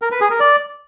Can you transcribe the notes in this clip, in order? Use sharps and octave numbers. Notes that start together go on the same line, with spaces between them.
A#4
B4
G#4
A#4
D5